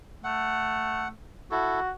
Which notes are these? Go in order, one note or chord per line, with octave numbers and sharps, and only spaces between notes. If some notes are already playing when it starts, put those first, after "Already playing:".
A3 F#5
E4 F#4 A4